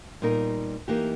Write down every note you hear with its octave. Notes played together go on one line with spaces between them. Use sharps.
A#2 G3 B3 D#4 A#4
E3 A#3 D#4 G4